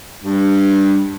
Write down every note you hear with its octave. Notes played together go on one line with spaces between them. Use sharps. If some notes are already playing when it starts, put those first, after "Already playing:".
G2